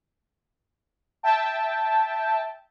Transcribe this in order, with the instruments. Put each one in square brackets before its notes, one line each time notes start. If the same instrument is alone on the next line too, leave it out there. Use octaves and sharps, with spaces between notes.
[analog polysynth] E5 G5 A5